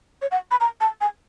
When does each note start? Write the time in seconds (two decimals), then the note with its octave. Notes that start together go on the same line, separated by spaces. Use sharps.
0.22 C#5
0.31 F#5
0.51 B5
0.60 A#5
0.81 A5
1.01 G#5